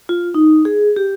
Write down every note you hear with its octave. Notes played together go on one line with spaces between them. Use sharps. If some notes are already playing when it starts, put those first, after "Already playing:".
F4
D#4
G#4
G4